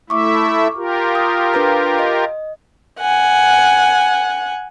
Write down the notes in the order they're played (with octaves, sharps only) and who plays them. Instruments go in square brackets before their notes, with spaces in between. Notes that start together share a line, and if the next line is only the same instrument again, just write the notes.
[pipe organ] A3 E4 E5 [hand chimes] C#6 D6
[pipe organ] F4 G4 A#4
[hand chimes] D#6
D4 B4 A#5
D#5
[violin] F#5 G#5